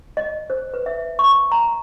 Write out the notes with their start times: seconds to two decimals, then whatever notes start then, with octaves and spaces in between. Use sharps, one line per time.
0.17 D#5
0.50 C5
0.74 B4
0.86 E5
1.19 C#6
1.52 A#5